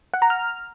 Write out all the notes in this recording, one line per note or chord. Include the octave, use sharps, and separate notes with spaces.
F#5
A#5
F6